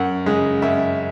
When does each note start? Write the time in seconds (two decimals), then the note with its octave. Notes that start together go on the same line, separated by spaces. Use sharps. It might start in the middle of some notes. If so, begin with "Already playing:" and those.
Already playing: F#2 F#5
0.26 C#3 G#3
0.62 F#2 E5